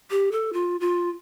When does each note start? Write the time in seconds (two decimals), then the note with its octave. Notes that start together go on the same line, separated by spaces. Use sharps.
0.11 G4
0.32 A4
0.53 F4
0.81 F4